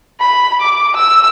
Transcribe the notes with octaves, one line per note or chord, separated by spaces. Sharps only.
B5
D6
E6